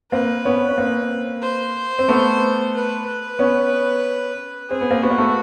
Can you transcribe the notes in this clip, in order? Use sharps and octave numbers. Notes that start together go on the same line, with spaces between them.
A#3 C4 B4
B3 C#4
C#4
A#3 C4
C5
C4
A3 B3
B4
B4
B3 C#4
C4 G#4
B3
A#3 C4
B3 F#4
A#3
A3 B3